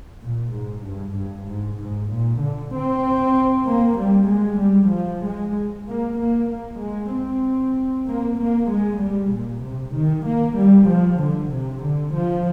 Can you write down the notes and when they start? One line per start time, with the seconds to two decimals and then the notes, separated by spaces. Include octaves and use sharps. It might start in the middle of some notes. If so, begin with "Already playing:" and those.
0.22 A#2
0.53 G#2
0.84 G2
1.16 G2
1.47 G#2
1.79 G#2
2.10 A#2
2.41 D3
2.73 C4
3.67 A#3
3.98 G3
4.30 G#3
4.61 G3
4.93 F3
5.23 G#3
5.86 A#3
6.18 A#3
6.49 A#3
6.80 G#3
7.12 C4
8.05 A#3
8.37 A#3
8.68 G#3
9.00 G3
9.31 A#2
9.63 C3
9.94 D#3
10.25 A#3
10.56 G3
10.88 F3
11.19 D3
11.50 C3
11.82 D3
12.13 F3